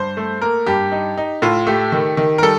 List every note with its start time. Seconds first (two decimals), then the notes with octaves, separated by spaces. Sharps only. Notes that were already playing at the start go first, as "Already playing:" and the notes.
Already playing: G2 C5
0.17 A3
0.42 A#3 A#4
0.66 G2 G4
0.92 D#4
1.17 D#4
1.42 A2 F4
1.67 A3 G4
1.92 D#3
2.17 D#3
2.38 A#4
2.42 G3 A4